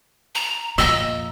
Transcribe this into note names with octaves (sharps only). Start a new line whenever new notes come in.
A#5
F2 A#2 D#5 A#5 E6